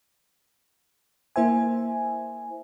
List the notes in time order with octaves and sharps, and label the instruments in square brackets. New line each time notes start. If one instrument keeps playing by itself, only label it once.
[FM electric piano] A#3 E4 C5 E5 G#5